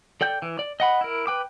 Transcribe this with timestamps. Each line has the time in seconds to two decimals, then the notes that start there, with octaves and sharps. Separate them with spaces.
0.21 A4 D5 G5 G6
0.42 E3
0.59 D5
0.80 D#5 F#5 B5
1.01 E4 A#4
1.27 B4 G5 D6